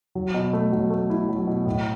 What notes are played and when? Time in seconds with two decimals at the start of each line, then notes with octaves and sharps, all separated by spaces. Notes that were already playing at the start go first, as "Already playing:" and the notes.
0.15 F#3
0.34 B2
0.53 A3
0.72 F#3
0.90 A3
1.10 E4
1.29 F#3
1.47 B2
1.66 A2